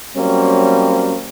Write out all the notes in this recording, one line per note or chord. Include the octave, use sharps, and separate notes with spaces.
F#3 G3 A#3 C4 C#4